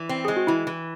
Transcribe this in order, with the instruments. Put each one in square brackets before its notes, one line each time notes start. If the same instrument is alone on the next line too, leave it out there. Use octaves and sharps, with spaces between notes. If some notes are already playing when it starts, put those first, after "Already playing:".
Already playing: [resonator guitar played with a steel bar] E3
C4
[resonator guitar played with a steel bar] G#3 [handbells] G#4
[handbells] F#4
[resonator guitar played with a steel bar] E3 [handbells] E4
[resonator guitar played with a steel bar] E3